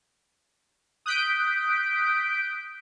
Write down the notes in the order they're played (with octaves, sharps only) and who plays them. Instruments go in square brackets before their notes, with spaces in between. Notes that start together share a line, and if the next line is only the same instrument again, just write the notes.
[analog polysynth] D#6 F#6 G6 B6 D7